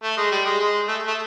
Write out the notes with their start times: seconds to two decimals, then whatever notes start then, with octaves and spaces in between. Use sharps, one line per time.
0.03 A3
0.17 G#3
0.32 G3
0.45 G#3
0.60 G#3
0.88 A3
1.07 A3